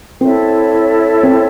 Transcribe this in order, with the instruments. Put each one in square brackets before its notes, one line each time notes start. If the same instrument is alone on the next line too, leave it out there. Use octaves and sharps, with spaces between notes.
[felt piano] C4 [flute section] E4 A4 C#5 E5
[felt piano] C4